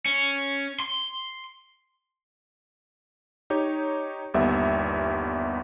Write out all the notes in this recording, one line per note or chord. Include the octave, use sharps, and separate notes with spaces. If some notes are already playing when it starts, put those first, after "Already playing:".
C#4
C6
D#4 G4 C#5
G1 D#2 G3 B3 E5